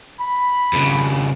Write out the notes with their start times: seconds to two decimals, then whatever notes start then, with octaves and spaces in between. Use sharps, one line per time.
0.20 B5
0.73 F2 C#3